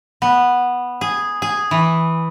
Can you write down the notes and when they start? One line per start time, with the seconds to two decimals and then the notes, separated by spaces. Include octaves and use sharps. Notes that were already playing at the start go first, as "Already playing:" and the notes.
0.22 B3
1.01 G#4
1.42 G#4
1.71 E3